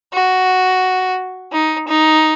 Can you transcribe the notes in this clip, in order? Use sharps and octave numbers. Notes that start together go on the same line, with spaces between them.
F#4
D#4
D#4